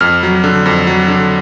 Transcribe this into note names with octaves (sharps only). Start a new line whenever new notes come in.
F2 F6
F#3
D3
F2
F#3
D3